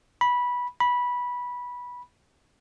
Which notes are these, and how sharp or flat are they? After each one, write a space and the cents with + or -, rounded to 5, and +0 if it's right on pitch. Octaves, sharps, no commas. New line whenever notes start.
B5 -15
B5 -15